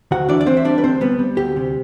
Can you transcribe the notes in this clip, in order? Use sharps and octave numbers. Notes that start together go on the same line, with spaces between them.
D2 F#4 F#5
E3 D4 D5
D5
E3 C4 C5
E5
G3 D4 D5
B4
D2 C4 C5
G3 B3 B4
G3
D2 G4
C3